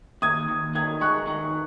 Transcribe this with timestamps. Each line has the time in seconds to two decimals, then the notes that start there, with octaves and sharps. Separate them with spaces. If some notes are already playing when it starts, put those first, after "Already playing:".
0.22 D#2 D#6 G#6
0.49 D#2
0.75 D#3 D#6 G#6
1.01 G#3 C#6 F#6
1.27 D#3